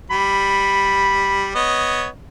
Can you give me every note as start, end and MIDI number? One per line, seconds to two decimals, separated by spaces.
0.10 1.51 55
0.10 1.58 83
1.55 2.07 59
1.55 2.07 73
1.55 2.07 75